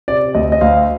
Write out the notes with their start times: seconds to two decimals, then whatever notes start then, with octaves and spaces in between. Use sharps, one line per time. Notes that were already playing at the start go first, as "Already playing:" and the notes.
0.08 C3 D5
0.35 D2 D#5
0.52 D#5
0.61 D2 F5